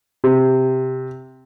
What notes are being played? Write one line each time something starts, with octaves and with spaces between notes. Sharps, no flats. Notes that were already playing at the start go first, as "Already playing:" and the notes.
C3